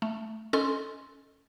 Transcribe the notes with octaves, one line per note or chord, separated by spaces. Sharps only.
A3
C#4 A4 D#5 C6